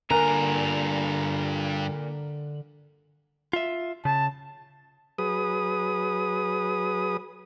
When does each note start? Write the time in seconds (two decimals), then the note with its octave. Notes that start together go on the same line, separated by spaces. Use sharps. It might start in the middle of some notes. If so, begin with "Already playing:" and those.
0.11 G2 A#2 D3 A#4 G#5 A#5 F#6
3.53 F4 E5
4.05 C#3 A5
5.18 F#3 G#4 B4 D#6